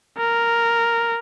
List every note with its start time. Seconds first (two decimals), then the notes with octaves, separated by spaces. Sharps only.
0.18 A#4